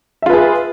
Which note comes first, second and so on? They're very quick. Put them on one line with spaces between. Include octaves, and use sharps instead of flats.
E5 F4 B4 G#4